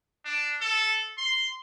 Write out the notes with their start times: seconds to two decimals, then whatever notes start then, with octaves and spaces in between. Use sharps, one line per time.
0.25 D4
0.61 A4
1.18 C6